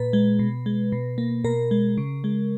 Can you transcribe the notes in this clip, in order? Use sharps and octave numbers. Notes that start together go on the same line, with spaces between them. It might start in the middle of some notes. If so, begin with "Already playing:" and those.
Already playing: A#2 B4
G#3
B2
G#3
B2
A#3
B2 A#4
G#3
C#3
G#3